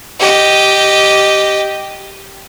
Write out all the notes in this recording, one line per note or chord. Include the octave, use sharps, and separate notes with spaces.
G4 D#5